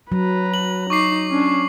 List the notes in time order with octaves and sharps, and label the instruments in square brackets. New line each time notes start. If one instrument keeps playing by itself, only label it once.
[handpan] F#3 [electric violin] B4 A#5
[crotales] F#7
[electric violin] D#4 [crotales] C#6 D6 C7
[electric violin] C#4 D4